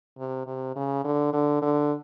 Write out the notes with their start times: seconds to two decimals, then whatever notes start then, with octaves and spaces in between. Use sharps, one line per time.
0.18 C3
0.47 C3
0.76 C#3
1.04 D3
1.33 D3
1.62 D3